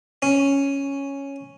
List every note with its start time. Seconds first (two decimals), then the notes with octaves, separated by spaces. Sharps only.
0.22 C#4